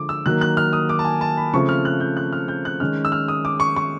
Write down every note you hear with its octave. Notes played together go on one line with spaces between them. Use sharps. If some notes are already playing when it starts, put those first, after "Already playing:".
Already playing: D3 F3 G#3 D6
E6
D#3 F#3 A#3 F#6
F#6
F6
D#6
D6
A5
G#5
A5
B5
C#3 F3 A3 C4 C#6
F6
F#6
G6
F#6
F6
G6
F#6
D#3 G#3 C#4 F6
E6
F6
D#6
D6
C#6
C#6